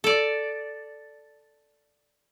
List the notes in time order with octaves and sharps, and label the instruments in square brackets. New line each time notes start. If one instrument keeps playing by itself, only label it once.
[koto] A4 D5